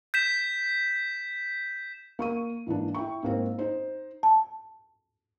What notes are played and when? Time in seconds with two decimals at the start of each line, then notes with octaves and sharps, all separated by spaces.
0.14 G6 B6 E7
2.19 A#3 C#6 D#7
2.66 G#2 E3 A#3 D4
2.95 E4 G5 C#6
3.23 G#2 A#3 C4
3.59 D#4 C5
4.23 A5